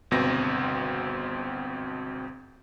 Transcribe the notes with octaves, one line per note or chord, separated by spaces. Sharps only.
G1 C#2 B2 C4 A#6